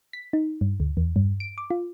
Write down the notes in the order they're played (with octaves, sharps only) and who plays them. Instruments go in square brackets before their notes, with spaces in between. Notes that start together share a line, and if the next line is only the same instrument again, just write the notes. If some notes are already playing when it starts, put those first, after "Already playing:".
[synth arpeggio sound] B6
D#4
G2
D2
E2
G2
D7
D6
F4